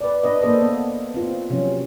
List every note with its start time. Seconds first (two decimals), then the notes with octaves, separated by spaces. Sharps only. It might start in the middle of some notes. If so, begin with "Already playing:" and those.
0.01 B4 D5
0.23 D4 B4 D#5
0.42 A#3 D4 A4 C5 D#5
0.61 B3
1.14 C4 F4
1.50 C3 F3 F#3 C#4